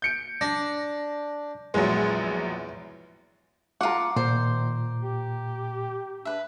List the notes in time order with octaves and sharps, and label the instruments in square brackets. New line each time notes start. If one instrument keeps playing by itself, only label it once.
[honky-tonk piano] G6 C#7 D7
[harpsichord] D4 [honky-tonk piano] A#6
[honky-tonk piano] A#1 F#3 G#3 [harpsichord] E2
[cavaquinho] F4 F#5 [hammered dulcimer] A#5 D6
[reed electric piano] A#2 [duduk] D#3 [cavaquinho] C5
[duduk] G4
[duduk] D4 [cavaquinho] B4 E5